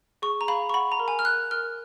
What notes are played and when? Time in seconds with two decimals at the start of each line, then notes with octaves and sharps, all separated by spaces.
0.22 G#4 C#6
0.41 A#5
0.48 F5 B5
0.70 C#6
0.74 F#5 B5
0.92 A#5
1.00 A#4
1.08 G#5
1.19 F6
1.25 A#4 F#6
1.51 A#4 F6